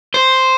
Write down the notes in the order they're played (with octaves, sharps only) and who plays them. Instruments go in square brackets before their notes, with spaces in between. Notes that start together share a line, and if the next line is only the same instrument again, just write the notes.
[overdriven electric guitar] C5